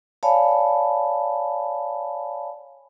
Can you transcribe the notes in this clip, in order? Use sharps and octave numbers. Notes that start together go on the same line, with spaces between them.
C#5 D5 F5 G#5 A5 B5